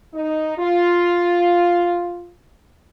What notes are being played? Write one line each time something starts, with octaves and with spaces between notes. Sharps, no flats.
D#4
F4